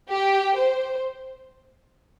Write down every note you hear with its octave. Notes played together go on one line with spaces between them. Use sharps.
G4
C5